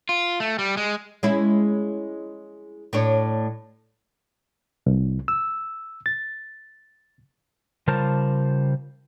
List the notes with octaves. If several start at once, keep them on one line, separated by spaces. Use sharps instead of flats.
F4
A3
G3
G#3
G#3 C#4 E4
A2 D4 C#5
C2
E6
A6
C#3 G3 F4 A#4 C5 A5